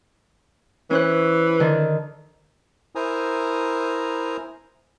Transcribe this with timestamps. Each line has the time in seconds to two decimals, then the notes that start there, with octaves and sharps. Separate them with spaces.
0.91 E3 C#4 C5 F#6
1.60 D3 D#3
2.95 E4 A#4 C5 G#5 A#5 D#6